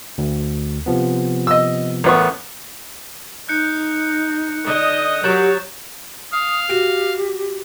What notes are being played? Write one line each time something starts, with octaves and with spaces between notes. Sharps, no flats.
D2
C3 F3 B3
D#5 E6
A1 B3 A#4 C#6
D#4 F#6 G6 C#7
D3 D#5 D#6 F#6
F#3 G4 A#4 C#5 F#5 G6 A6 E7
F5 D#6
F#4 G4